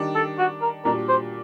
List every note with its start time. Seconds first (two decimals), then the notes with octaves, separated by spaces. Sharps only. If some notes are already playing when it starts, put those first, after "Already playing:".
Already playing: D#3 G3 D4
0.15 A4
0.39 F#4
0.62 A#4
0.85 A#2 G3 D4 F#4 A#4
1.09 C5